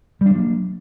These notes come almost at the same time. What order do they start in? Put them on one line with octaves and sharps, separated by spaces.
G3 D4 F#3 A#3